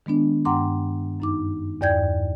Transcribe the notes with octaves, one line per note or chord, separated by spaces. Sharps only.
D#3 G#3 B3 D4
G2 F#5 G5 A#5 C6 D6
F#2 D#4 D6
E2 G2 D5 G5 G6 G#6